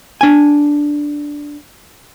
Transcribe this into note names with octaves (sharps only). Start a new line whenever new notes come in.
D4 G#5